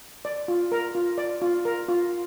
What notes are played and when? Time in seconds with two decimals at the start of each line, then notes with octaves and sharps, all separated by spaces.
0.25 D5
0.48 F4
0.72 A#4
0.95 F4
1.18 D5
1.42 F4
1.65 A#4
1.89 F4